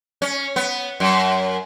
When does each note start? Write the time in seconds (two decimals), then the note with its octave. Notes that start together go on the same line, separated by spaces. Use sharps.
0.22 C#4
0.56 B3
1.00 F#2